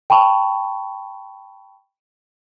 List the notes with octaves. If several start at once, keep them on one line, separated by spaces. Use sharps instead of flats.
G5 A5 B5 C#6